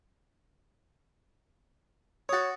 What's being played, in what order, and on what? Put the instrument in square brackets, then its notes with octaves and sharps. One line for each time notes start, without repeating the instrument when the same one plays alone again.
[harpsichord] F#4 D#6 [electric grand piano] C#5 A6